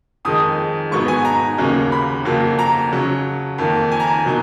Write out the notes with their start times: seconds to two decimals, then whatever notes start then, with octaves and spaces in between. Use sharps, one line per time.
0.25 F2 D#3 G#3 D#4 D#6
0.91 G#2 F#3 B3 D#4 C#6
1.08 G#5
1.25 A#5
1.58 D#2 C#3 F#3 A#3 C#4
1.92 B5
2.25 F2 C#3 F#3 A#3
2.59 A#5
2.92 C#3 F#3 C#4
3.58 F2 D#3 A#3
3.92 G#5
4.00 A#5
4.07 G#5
4.25 B2 F#3 A#3 D#4